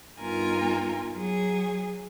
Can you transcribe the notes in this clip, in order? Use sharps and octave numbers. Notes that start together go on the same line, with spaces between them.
G2 B3 D#4 F4 A#4 G#5
F#3 G#4